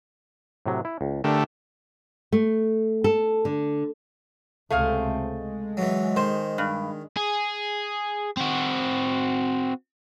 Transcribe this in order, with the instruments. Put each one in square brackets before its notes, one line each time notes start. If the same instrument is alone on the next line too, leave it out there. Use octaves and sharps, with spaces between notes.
[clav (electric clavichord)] A2 C3 F#3
E4
C#2
[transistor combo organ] D3 A3 G4 [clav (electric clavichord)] D4 A#4
[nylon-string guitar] A3
A4
D3
[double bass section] C#2 C3 C4 [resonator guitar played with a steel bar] A3 G#4 F5
[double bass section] G#3
[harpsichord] E3 F#3
[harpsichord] D#3 [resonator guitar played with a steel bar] C5
[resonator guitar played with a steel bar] G2
[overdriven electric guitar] G#4
C4 F#4